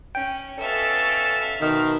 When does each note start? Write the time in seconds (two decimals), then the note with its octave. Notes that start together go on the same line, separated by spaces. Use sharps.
0.15 C#4 G5
0.59 B2 C#4 A4 E5 F5
1.61 B2 D#3